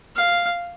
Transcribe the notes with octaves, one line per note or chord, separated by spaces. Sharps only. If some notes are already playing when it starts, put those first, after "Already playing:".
F5